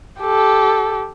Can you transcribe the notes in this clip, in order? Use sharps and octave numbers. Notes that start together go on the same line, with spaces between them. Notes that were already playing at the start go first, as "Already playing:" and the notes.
G4 A4